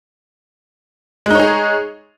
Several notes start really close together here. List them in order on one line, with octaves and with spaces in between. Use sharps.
G#3 D#4 C#5 G#4